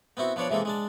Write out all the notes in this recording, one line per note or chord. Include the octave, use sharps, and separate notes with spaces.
B3 C4 E4 F#4
F3 B3 D4 C#5 D5
C3 E3 G#3 A#3 A4
G#3 D4 A5